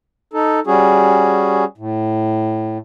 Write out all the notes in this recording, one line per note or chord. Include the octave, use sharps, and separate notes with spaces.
D#4 A4
G3 C#4 F#4 G#4
A2